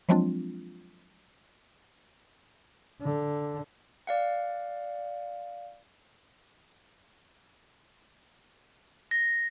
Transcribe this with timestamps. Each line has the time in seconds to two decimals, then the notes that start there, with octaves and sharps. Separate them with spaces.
0.09 F3 F#3 G#3 C4 D4 F4
3.02 D3
4.07 D5 F5 F#5
9.11 A#6